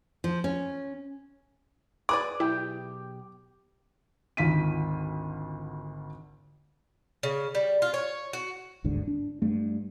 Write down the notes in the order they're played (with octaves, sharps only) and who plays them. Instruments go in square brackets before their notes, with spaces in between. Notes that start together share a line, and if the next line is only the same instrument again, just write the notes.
[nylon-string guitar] F3
C#4
[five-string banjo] G#4 B4 D5 [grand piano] D6
[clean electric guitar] B1 G4 G5 [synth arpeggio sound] E4
[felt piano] G#1 D2 F4 B6 D#7
[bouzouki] C#3
G3
F4
C#5
F#4
[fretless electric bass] G1 D2 G#2 D3
D4
G2 A3